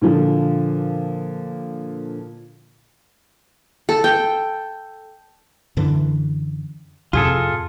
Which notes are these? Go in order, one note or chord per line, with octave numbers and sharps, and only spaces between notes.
A#2 D3 F3
A4
G5
F#2 D3 E3
F2 A2 C3 F4 G#4 A4